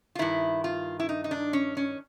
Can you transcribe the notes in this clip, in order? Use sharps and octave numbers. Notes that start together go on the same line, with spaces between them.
F4
G2 D#3 E4
F4
E4
D#4
D#4
D4
C#4
C#4